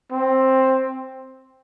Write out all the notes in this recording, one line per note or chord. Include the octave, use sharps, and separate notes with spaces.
C4